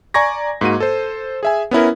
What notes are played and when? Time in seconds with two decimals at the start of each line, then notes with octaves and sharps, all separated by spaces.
0.14 D5 G#5 A#5 C#6 G#6 A#6
0.61 G#2 A#3 F#4 D#7
0.80 A4 C5
1.43 G#4 E5 G#5
1.71 B3 C#4 E4 A#4